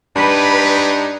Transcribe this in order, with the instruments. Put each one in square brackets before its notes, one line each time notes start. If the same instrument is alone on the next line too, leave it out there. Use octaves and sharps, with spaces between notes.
[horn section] G2 D4 D#4 [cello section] B4